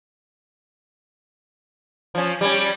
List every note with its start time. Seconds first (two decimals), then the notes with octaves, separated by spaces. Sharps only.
2.15 F3 C#4
2.41 G3 C#4